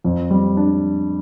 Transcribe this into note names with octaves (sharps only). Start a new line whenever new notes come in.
F2
G3
D4